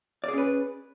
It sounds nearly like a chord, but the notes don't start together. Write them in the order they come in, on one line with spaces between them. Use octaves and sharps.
D5 G#4 C#4 B4